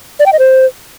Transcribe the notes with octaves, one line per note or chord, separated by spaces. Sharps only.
D5
G5
D#5
C5